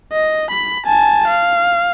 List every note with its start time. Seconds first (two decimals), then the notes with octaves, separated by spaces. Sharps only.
0.13 D#5
0.50 B5
0.86 G#5 A5
1.28 F5